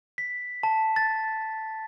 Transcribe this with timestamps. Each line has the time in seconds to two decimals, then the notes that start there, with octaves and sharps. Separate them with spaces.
0.18 B6
0.63 A5
0.96 A6